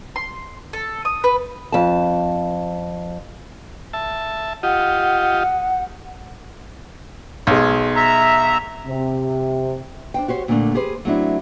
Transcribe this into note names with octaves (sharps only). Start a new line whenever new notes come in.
C6
A4
D#6
B4
F2 A5
E5 A5
F4 G4 D#5 F#5
B1 G#3
E5 A#5
C3
D4 C5 G5
F#4 G4 C5 C#5
A#2 D3 G3 A3 A#3 D4
G4 G#4 B4 C5
F#3 A3 C4 D4 E4